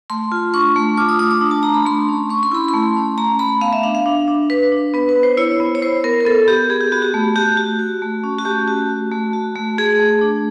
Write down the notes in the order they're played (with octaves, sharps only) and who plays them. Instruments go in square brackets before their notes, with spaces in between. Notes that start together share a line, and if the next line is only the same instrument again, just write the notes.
[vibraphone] A3 C6
F4
D4 C#6
A3
F4 D6
D#6
A3 D#6
D6
D4
A5
D4 A#5
B5
A3 C6
C#4
C#4 C#6
C6
E4 B5
C6
A3
C#4
A3 A#5
A3 B5
B3 F5
E5
D4 F5
F5
D4
D4
D4 B4
D4
B3 B4
B4
B3
C5
E4 C#5
B3
C#5
E4 C5
B3 A#4
A#4
B3 A4
B3 G4
B3 G#4
G4
B3 F#4
G4
A3
F#4 G4
F#4
F#4
A3
C#4
F#4
A3 G4
F#4
F#4
A3
F#4
A3
A3 G#4
A3
D4